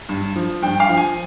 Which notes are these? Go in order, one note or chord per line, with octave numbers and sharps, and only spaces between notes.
G2
F3
G2 G5
F5
F3
G#5